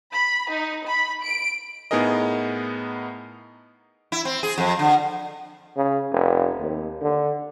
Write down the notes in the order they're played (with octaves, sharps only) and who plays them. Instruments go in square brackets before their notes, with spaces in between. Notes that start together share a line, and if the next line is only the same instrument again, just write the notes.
[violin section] B5
D#4
B5
D7
[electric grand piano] A2 B3 D#4 G#4 A#4 D#5
[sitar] E4
C4
G#4
F2
D3
[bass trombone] C#3
F1
D#2
D3